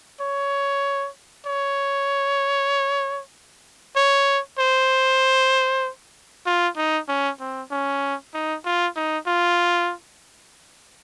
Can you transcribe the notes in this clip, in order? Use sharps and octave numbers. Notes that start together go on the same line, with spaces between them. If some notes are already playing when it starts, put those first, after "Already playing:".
C#5
C#5
C#5
C5
F4
D#4
C#4
C4
C#4
D#4
F4
D#4
F4